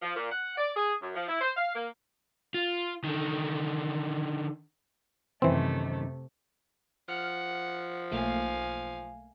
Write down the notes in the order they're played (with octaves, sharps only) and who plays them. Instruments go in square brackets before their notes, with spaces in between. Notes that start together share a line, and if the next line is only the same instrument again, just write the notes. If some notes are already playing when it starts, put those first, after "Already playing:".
[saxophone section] F3
A#2
F#5
D5
G#4
F#2
F3
E4
C5
F5
A#3
[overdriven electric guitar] F4
D3 D#3
[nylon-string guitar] F#2 D#3 C5 [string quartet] C3 A3 [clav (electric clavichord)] E3 C4
[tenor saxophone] F3 [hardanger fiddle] F#5 [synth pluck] F6
[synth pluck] B1 A3 A#3 [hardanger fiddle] F5 G#5